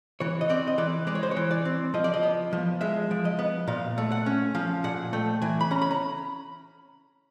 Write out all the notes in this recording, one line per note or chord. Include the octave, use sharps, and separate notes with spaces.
E3 C#5
D#5
C4 D5
D#5
E3 D5
G#3 D5
C#5
C5
C#5
E3
D5
C4
F3 D#5
D5
D#5
B3
F3
G#3 E5
F3
D#5
B3
A#2 F5
A3
F#5
C#4
F3 F5
A#2 F#5
A3 G5
E3 G#5
B5
C#4 A#5
B5
A#5